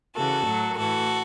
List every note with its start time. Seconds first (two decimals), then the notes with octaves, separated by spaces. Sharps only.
0.15 C#3 E3 F#4 A4
0.46 A2 F#3
0.77 A2 E3 F#4 A4